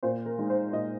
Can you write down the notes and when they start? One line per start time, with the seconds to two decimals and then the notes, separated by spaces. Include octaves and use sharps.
0.03 A#2 C5
0.26 A#4
0.39 G#3 D#4
0.50 C5
0.72 A#2 D#5